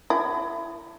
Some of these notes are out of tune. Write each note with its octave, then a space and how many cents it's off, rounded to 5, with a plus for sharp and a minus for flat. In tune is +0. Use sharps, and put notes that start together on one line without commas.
E4 +25